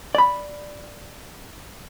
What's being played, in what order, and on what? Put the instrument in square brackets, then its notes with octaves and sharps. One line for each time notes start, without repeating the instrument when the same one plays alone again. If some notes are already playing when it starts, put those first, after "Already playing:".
[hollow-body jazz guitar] D5 B5